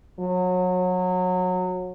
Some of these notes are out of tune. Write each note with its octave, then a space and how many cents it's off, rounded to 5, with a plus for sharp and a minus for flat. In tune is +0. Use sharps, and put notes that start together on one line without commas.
F#3 -25